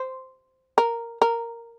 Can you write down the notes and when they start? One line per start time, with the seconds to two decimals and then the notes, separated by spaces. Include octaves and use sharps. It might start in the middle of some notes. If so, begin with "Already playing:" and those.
Already playing: C5
0.78 A#4
1.22 A#4